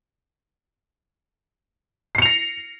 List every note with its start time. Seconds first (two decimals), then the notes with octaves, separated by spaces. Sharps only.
2.15 C7
2.18 C#7
2.22 F7
2.26 A#6